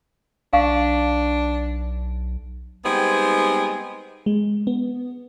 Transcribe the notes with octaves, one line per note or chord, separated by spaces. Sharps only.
B1 D4 F5 C#6
G3 G#3 B3 C4 D#4 G#4
G#3
B3